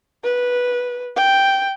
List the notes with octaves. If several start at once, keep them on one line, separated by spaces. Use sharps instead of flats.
B4
G5